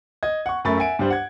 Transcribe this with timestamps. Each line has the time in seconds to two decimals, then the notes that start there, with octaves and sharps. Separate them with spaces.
0.23 D#5 G#6
0.46 F#5 C#6
0.65 F#2 A3 A#4 B5 C#6 A6
0.77 E5 F#5 G#5 D7
0.99 G2 G3 C5
1.10 F#5 G#6